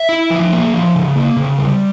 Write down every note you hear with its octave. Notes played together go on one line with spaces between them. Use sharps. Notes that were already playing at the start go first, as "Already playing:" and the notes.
Already playing: E5
E4
F3
A#3
F3
C#3
A#3
C#3
G3